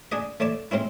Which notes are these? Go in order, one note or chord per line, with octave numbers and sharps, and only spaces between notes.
D4 G#4 D5 D#5
A3 C#5 D5 A5
G#3 C4 C#4 E4